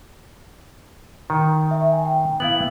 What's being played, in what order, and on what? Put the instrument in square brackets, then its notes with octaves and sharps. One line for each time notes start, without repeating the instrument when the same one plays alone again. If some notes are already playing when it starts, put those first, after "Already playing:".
[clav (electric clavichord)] D#3
[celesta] E5
G#5
G5
[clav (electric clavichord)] B3 E4 [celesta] F5 F#7